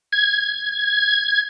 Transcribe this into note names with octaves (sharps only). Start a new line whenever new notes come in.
G#6